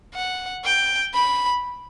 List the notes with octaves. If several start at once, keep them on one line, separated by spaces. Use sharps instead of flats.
F#5
G5
B5